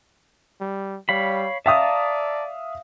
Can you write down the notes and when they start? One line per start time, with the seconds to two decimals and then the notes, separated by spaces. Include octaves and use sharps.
0.61 G3
1.09 G3 C#5 F5 B5
1.66 D5 E5 F5 A5 A#5 D#6